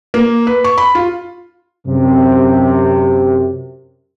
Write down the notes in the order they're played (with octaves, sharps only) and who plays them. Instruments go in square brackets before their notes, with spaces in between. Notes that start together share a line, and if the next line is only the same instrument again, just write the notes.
[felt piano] A#3
B4
C#6
B5
F4
[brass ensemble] F#2 C3